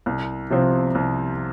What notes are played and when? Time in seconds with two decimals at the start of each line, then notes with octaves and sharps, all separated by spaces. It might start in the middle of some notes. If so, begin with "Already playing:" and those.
0.06 C2
0.50 C3 F3 C4
0.95 C2